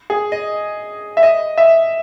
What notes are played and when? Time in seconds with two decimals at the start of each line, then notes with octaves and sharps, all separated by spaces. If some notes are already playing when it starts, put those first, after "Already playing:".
0.10 G#4
0.32 D#5
1.17 E5
1.23 D#5
1.58 E5